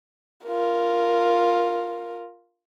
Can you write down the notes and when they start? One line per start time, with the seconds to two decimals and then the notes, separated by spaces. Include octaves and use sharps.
0.46 F4 A#4